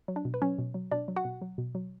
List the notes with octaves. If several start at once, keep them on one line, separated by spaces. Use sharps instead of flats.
F#3
D4
B2
B4
F#3 C#4 C#5
B2
F#3
B2 D4 D5
F#3
F#4 F#5
B2
F#3
B2
F#3